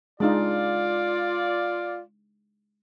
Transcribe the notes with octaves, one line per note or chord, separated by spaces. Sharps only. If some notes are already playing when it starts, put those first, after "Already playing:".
G#3 D4 D#4 F4 D5